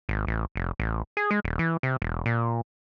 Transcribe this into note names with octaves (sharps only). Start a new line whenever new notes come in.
G#1
A1
F1
A1
G#4
G#3
D#1
E3
C3
E1
A#2